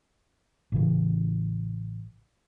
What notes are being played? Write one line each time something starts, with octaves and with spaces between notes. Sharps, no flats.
A1 C#3 E3